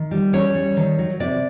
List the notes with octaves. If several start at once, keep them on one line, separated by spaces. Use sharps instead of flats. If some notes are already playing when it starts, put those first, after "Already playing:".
Already playing: D#3
G3
C#4 C#5
G3
D#3
F#3
C3 D5